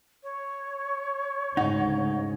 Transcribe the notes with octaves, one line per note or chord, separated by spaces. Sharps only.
C#5
D2 G#2 C#3 D#4 F#5